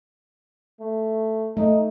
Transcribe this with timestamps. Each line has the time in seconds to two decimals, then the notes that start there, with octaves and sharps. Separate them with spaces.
0.81 A3
1.57 A3 D#4